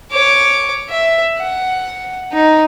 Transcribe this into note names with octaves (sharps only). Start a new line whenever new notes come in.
C#5 D6
E5
F#5
D#4